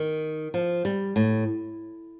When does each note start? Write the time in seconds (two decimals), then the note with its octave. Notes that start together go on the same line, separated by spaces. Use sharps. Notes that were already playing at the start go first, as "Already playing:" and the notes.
Already playing: D#3
0.54 F3
0.85 G3
1.16 A2